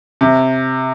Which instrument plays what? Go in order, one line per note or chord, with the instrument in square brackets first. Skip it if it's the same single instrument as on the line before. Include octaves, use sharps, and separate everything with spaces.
[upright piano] C3